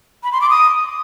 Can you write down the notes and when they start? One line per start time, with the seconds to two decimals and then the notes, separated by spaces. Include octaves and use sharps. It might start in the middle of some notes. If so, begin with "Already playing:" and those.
0.23 B5
0.32 C6
0.41 D6
0.50 D#6